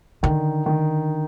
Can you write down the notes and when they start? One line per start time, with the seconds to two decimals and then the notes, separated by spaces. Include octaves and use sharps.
0.23 D3 D#3
0.66 D#3